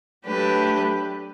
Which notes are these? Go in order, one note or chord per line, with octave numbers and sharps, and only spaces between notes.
F#3 A3 D4 G4 B4